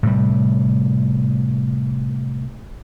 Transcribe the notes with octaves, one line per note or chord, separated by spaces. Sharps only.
A2 C3 G3